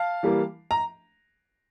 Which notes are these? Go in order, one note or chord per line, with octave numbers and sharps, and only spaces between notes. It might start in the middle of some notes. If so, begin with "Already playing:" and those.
Already playing: F5 A5
E3 G3 A#3
A#5